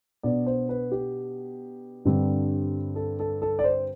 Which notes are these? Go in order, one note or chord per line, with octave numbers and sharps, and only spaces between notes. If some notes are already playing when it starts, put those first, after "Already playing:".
B2 B3 D4 D5
C5
B4
G4
G2 D3 G3 C4
A4
A4
A4
D5
C5